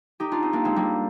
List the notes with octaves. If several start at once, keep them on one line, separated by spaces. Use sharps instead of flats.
D#4 G4
D4 F4
C4 D#4
A#3 D4
G#3 C4
G3 A#3